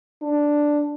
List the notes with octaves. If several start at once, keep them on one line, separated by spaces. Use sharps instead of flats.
D4